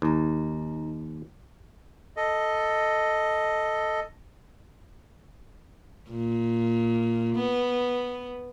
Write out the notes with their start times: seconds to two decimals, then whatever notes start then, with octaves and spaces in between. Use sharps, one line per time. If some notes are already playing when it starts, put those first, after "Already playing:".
0.02 D#2 D#4 A#5
2.17 A4 D#5
6.10 A#2
7.36 B3